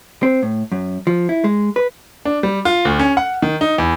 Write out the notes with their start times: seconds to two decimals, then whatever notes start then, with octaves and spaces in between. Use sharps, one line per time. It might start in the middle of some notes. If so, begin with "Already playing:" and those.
0.23 C4
0.43 A2
0.72 F#2
1.07 F3
1.29 E4
1.44 G#3
1.76 B4
2.25 D4
2.43 G3
2.65 F4
2.85 D2
2.99 C#4
3.17 F#5
3.42 D#3
3.61 D#4
3.78 E2